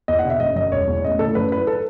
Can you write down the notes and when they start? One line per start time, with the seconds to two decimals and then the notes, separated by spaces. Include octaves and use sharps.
0.08 E2 D#5
0.19 F#5
0.25 B2
0.30 E5
0.40 F#1 D#5
0.56 F#2 D#5
0.72 E1 C#5
0.88 E2
1.03 A1 D#5
1.19 A2 A4
1.35 F#2 B4
1.52 E3 B4
1.67 A4